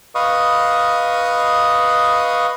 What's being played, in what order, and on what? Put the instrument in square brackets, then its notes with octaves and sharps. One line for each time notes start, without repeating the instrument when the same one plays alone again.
[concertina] B4 D#5 F5 C#6 D#6